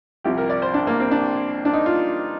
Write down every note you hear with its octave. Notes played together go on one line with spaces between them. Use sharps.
C2 C3 F3 G4
A#4
D5
C5
D4
A#3
C4
D4
D4
D#4
F4